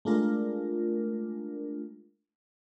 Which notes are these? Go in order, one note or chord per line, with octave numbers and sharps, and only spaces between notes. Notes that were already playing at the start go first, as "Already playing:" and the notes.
G#3 A3 D4 F4 A#4